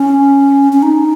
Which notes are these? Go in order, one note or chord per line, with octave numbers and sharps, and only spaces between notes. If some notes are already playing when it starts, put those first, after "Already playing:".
Already playing: C#4
C#4
D#4